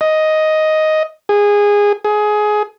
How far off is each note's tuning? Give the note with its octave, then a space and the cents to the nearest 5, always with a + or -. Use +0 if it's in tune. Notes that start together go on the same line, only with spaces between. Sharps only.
D#5 +5
G#4 -15
G#4 +20